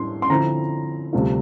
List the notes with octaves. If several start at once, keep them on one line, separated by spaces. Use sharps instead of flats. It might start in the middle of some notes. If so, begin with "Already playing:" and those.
Already playing: A2 G3 D4 C6
C6
D3 F3 C4 E4 A#5
D2 C3 G3 D4 F4